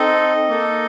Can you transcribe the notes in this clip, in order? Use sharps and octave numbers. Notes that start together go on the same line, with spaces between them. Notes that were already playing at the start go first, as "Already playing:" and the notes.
Already playing: C4 D#4 A4 D#5
A#3 D#4 A4